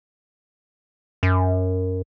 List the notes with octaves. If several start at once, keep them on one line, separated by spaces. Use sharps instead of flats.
F#2